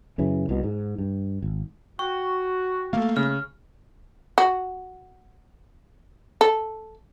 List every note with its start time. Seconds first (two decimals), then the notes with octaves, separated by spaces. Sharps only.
0.18 F#2 C#3 E3
0.49 C2 B2
0.63 G#2
0.98 G2
1.42 G#1
1.99 F#4 G5 C#6
2.93 A3 A#3 A4 F5
3.17 C#3 F6
4.38 F#4
6.41 A4